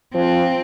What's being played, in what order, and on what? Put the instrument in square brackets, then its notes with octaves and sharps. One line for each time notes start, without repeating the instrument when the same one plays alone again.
[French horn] F3 [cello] C4